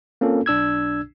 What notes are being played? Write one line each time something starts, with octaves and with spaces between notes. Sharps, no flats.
A#3 C4 C#4 F4 A4
B1 D4 E6 G#6